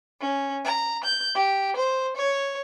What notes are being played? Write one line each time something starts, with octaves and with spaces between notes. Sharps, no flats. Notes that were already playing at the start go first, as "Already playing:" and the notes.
C#4
A#5
G6
G4
C5
C#5